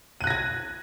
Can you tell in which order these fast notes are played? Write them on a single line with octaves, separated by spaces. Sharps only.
D#7 F#6 A#6 G#6